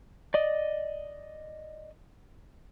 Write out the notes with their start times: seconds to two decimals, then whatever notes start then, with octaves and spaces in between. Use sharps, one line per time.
0.34 D5 D#5